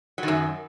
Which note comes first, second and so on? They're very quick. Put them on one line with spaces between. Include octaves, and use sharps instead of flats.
F#3 D#3 F#2